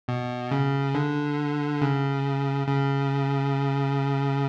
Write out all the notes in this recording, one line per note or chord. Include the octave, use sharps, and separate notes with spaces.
B2
C#3
D3
C#3
C#3